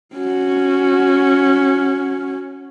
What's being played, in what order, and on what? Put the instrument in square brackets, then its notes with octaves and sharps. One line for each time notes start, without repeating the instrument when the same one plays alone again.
[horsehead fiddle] C#4 F#4